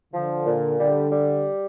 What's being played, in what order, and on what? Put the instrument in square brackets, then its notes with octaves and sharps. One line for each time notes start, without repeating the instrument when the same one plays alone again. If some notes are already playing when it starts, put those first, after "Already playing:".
[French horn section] D3 [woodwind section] F3
[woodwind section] A#2
[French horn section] D3 [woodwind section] G3
[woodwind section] G3